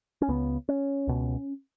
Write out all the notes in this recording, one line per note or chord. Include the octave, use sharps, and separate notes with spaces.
C#4
C#2 C#3 B3
C#4
C#2 B2